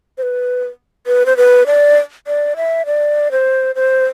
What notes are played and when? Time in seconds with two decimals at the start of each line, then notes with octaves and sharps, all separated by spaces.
0.18 C5
0.23 B4
1.07 B4
1.26 C5
1.37 B4
1.66 D5
2.27 D5
2.57 E5
2.86 D5
3.31 C5
3.75 C5